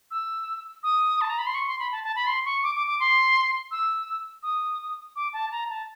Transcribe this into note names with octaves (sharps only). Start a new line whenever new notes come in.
E6
D#6
A5
A#5
B5
C6
C#6
C6
B5
A5
A5
B5
C6
C#6
D6
D6
D6
C6
E6
D#6
D6
A5
A#5
A5